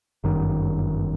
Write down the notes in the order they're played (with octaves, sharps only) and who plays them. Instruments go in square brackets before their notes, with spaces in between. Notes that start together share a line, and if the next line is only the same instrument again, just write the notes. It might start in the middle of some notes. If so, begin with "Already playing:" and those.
[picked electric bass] G1 F#2 D#3